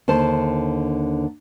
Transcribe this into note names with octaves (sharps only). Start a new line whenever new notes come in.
D#2 D3 C5 A5